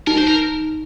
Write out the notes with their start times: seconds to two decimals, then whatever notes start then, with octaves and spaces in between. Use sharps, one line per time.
0.07 D#4 A#4
0.18 C5
0.28 A#4